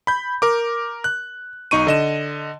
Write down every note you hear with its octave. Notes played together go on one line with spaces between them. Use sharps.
B5 G6
A#4 D6
F#6
B1 D#4 C#6 D#7
D3 D#5 E7